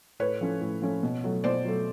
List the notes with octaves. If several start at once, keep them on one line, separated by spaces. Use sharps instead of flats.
A2 B4 C#5
F3 A3 C#4
A2
F3 A3 C#4
B2
F#3 A3
B2 C5 D5
F#3 A3